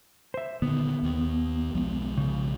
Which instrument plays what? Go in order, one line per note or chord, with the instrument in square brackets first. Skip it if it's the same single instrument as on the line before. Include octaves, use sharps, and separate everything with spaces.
[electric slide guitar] C5 E5
[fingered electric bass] A#2 D3 D#3 [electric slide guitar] B3
[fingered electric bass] D#2 D#3
B1 F3 G#3
[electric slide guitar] C#3